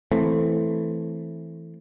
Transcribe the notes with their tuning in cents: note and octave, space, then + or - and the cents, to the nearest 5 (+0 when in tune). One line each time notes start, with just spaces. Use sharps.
E3 +0 A3 +0 C4 +0